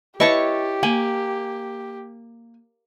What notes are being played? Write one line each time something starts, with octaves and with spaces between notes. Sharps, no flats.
E4 G4 B4 C#5 D#5 A5 C#6
A#3 G#5